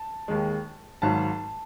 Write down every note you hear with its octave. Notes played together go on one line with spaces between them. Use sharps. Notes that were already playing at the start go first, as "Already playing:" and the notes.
Already playing: A5
D#2 D#3 G#3
G#1 G#2 F#3 A5